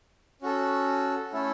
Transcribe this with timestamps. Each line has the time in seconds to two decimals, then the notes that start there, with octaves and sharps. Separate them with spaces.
0.42 C#4 F#4 A4
1.33 A3 C#4 E4 A4